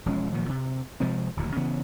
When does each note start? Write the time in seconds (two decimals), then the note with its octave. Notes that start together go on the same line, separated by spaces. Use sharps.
0.06 E1 F3 G#3 C#4
0.33 A#2 D#3 F3 F#3
0.49 C3
1.00 C3 F3 G#3 C4
1.37 D1 D#2 A#2
1.56 C#3 E3 B3